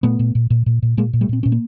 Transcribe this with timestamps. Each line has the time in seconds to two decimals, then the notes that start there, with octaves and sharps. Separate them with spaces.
0.03 A#2 A3 B3
0.19 A#2
0.35 A#2
0.50 A#2
0.66 A#2
0.82 A#2
0.97 A#2 G#3 A#3
1.13 A#2
1.21 G3 A3
1.29 A#2 C4
1.43 A#2 C#4
1.52 A#3